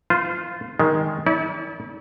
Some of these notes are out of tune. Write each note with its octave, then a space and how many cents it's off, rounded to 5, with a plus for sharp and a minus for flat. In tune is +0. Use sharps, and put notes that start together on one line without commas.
F4 +0 C5 -35
D#3 +15 G#3 +0
E4 -40 D5 -35